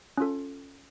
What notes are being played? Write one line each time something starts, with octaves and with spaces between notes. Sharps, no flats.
C#4 F4 A4